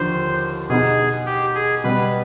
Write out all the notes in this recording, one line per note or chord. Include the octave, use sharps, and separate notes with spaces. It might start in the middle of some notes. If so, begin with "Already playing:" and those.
Already playing: D#2 D3 F3 C5
B2 B3 D#4 G#4
G4
G#4
B2 G3 B3 B4